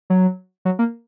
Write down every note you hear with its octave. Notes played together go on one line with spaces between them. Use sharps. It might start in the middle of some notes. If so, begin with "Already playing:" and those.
F#3
F#3
A#3